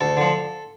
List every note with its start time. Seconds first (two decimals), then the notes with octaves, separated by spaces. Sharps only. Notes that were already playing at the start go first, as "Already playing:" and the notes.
0.01 D2 A4
0.17 D3 F3